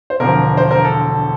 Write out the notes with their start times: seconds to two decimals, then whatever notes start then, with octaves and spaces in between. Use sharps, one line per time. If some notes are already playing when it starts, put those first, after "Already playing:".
0.10 C5
0.20 E1 D2 D3 F3 A#4
0.57 C5
0.71 A#4
0.85 A4